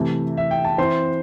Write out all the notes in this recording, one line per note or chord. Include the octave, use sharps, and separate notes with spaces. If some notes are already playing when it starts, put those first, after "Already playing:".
Already playing: C3 E3 A3
E5
G5
A5
E3 C4 E4 C5 C6